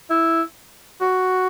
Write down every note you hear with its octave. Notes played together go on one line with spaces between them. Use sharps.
E4
F#4